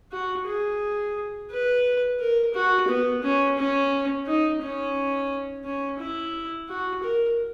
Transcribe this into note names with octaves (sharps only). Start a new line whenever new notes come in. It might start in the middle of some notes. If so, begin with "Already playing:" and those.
F#4
G#4
B4
A#4
F#4
B3
C#4
C#4
D#4
C#4
C#4
E4
F#4
A#4